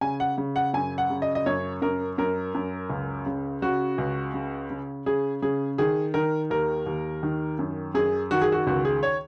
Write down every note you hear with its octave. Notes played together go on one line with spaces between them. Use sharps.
C#3 G#5
F#5
C#3
F#5
F#2 G#5
F#5
C#3
D#5
D#5
F#2 C#5
F#2 A#4
F#2 A#4
F#2
C#2
C#3
C#3 F#4
C#2
C#3
C#3
C#3 G#4
C#3 G#4
D#3 G#4
D#3 A#4
D#2 A#4
D#2
D#3
F#2
F#2 G#4
D#3 F#4
G#4
F#4
C#2 F#4
G#4
C#5